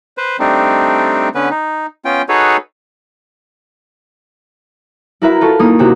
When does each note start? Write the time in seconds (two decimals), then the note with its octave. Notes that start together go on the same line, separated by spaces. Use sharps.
0.17 B4 C5
0.40 G3 A3 C4 D4 D#4
1.35 D3 B3 C#4 B4
1.50 D#4
2.05 B3 C#4 F4 G5
2.29 D#4 F#4 G#4 A4 B4 C#5
5.22 E4 F#4 A#4 B4 E5
5.41 F4 A4 C#6
5.59 A#3 D#4 D#6
5.79 C3 F#4 G4